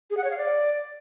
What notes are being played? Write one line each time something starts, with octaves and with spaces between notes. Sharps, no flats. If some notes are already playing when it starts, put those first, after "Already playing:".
G#4
F#5
C#5
F5
D5